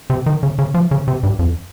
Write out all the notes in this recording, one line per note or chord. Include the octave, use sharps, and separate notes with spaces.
C3
D#3
C#3
C#3
F3
C#3
C3
G2
F2